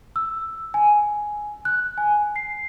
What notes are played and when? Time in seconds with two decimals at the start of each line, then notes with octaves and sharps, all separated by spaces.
0.16 E6
0.74 G#5
1.65 F#6
1.98 G#5
2.36 C7